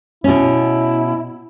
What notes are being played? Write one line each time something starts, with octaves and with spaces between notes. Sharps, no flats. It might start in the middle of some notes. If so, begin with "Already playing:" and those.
B2 C#4 E4